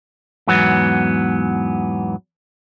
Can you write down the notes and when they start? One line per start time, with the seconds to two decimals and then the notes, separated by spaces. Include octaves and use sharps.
0.47 E2 G#2 F#3 B3